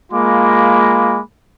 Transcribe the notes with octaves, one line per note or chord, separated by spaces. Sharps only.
G#3 A#3 F4 B5 D6